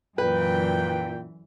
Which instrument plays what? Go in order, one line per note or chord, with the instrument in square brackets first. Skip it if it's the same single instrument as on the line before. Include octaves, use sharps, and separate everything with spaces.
[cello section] F#2 D3 E3 [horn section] A#2 G5 [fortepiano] B4